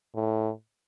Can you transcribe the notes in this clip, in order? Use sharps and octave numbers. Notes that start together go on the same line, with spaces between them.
A2